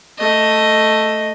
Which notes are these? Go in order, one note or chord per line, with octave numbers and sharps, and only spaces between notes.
A3 D#5